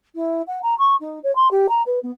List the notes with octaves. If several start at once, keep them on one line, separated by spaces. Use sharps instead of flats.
E4
F#5
A#5
C#6
D#4
C#5
C6
G4
A#5
B4
B3